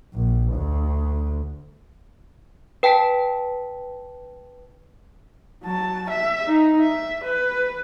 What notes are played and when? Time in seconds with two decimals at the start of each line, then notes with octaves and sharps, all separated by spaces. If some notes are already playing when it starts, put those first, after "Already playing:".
0.14 A#1
0.54 D2
2.83 B4 G5 A5 B6 D7
5.64 F#3 A5
6.10 E5
6.47 D#4
6.81 E5
7.24 B4